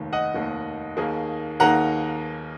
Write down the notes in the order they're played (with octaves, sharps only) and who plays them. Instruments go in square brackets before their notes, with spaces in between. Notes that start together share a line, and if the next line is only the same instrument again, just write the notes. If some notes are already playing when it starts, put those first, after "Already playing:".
Already playing: [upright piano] F1 D#2 D#3
[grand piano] D#5 F#5
[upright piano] F1 D#2 D#3
D#2 D#3 A#3 D#4 G#4
[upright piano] D#2 D#3 A#3 D#4 G#4 [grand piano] F#5 A#5